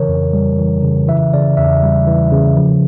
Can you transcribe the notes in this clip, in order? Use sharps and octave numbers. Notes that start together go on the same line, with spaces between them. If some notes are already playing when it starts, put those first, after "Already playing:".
Already playing: C#3 E3 A#4 C#5
F2
G3
E3
C#3
E3 E5
C#3 D5
E2 E5
G3
E3
C#3
F3